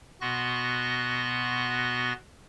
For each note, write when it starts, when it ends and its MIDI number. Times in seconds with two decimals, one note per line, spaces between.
0.21 2.13 47
0.21 2.13 59
0.21 2.13 66
0.21 2.13 84
0.21 2.13 90
0.21 2.13 94